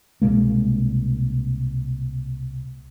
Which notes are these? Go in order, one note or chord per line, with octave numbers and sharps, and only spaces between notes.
C2 B2 G#3 A#3